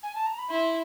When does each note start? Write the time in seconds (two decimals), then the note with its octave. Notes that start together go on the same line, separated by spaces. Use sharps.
0.03 G#5
0.15 A5
0.26 A#5
0.38 B5
0.50 E4 C6